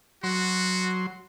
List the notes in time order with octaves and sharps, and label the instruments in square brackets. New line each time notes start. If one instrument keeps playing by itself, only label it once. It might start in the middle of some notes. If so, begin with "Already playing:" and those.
[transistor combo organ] F#3 C6 [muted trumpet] F#4